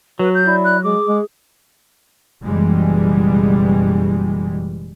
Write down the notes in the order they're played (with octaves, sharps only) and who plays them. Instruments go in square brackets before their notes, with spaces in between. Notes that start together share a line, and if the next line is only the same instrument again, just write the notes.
[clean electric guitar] F#3 [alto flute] F#4 [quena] B4
[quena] G6
[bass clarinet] E4 [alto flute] D5
[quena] F#6
[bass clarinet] G#3 [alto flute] G#4 [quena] D6
[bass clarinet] G#3
[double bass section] F#1 B2 E3 G3 G#3